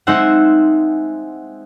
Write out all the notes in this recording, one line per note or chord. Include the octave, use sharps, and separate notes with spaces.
G#3 C4 D#4 C5 E5 F#5